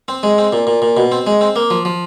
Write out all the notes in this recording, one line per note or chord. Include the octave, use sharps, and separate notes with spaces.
C4
G#3
C4
A#2
A#2
A#2
B2
C4
G#3
C4
A#3
F3
F3